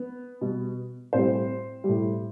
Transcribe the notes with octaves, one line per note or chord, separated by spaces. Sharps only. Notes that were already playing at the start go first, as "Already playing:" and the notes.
Already playing: B3
B2 G3
A2 G3 C4 C5
A2 G3